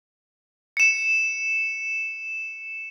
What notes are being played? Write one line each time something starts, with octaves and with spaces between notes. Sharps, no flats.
C#7 E7